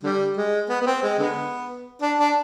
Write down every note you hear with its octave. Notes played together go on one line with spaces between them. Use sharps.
D3 G3
G#3
B3
B3
C4
G#3
D3 G#3 B3
D4
D4